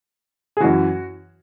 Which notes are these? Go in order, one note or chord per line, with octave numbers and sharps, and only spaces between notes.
G#4
F#2 E3 F#4